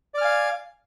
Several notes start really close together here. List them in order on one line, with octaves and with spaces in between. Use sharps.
D5 F6 G#5 F5